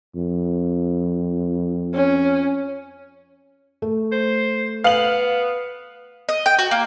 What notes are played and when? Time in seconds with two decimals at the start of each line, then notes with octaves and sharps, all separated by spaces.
0.16 F2
1.94 C#4
3.82 A3 A4
4.12 C5
4.84 B3 F5 F#7
6.29 D#5
6.46 G5
6.59 F#4
6.71 A#3